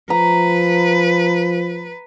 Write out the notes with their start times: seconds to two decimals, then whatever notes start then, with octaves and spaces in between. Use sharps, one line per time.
0.10 F3 B4 A#5